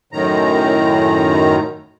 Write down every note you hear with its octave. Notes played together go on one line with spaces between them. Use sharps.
F#2 A2 D#3 A#5